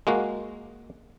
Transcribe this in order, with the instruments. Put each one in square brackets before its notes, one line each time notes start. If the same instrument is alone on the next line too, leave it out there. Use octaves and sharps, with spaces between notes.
[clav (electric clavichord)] G#3 A#3 F#4